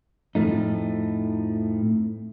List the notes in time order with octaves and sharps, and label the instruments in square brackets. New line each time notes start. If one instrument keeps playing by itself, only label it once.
[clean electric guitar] F2 A2 F3 A3 D#4